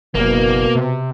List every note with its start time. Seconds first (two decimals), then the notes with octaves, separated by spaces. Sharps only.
0.15 F#1 B2 A#3
0.75 C3